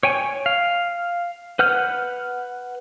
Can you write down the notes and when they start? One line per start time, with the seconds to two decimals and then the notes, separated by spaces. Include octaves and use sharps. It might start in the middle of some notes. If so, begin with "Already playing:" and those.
0.03 C#5 G5 G#5
0.46 F5
1.59 B4 F#5 F6 G6